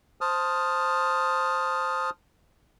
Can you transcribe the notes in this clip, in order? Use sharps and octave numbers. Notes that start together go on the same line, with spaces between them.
C5 A5 D#6 F6